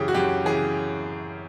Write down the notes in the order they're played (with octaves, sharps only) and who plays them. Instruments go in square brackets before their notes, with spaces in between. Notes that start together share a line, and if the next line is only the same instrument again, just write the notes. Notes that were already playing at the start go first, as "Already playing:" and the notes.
Already playing: [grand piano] F#2 C#3 E3 G4 G#4
F#4
F#2 G4
C#3 E3 G#4